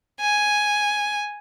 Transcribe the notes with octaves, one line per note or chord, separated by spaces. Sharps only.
G#5